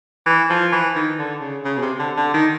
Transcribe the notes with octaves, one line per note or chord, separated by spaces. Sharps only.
E3
F3
E3
D#3
D3
C#3
C#3
B2
C3
D3
D3
D#3